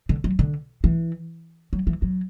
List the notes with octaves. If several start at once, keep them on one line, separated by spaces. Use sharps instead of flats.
D3
F#3
D3
E3
F#3
E3
F#3